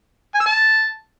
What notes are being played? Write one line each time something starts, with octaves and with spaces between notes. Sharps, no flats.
G#5
E6
A5